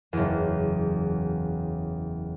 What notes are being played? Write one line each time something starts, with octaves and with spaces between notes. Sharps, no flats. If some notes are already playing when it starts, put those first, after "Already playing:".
F#1 E2